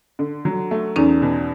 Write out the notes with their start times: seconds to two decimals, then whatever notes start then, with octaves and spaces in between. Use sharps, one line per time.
0.19 D3
0.45 F#3
0.71 A3
0.96 E2 C#4 D#4
1.22 B2